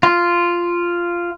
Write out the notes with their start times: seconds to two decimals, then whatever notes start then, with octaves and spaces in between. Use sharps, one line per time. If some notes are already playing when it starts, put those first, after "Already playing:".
0.03 F4